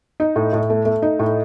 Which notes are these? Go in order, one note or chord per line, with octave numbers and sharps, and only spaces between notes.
D#4
A2
A2
A3
A3
D#4
A2